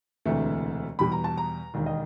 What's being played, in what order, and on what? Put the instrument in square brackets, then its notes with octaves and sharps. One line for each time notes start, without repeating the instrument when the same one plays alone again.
[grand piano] E1 D2 C3 E3 A3
E2 B2 G3 B5
A#5
A5
A#5
E1 D#2 D#3
D#5